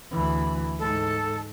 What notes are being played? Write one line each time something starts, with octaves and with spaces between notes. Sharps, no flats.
D2 E3
G#2 A4